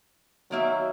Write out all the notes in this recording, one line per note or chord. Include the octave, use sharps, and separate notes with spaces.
D#3 F#3 A#3 E5